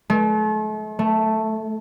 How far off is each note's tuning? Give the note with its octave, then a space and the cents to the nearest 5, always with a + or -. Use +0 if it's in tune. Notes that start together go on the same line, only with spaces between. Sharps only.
A3 -40
A3 +0